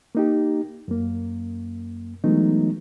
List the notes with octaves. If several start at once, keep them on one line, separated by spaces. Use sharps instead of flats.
A#3 D#4 G4
F#2 A#3
E3 F#3 G#3 A3 B3 D#4